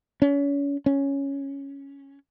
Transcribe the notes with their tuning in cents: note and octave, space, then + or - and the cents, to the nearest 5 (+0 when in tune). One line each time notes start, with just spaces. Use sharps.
C#4 +35
C#4 +0